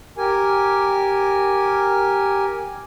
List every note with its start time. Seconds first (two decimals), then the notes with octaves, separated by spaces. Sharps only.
0.18 G4 A#4 G#5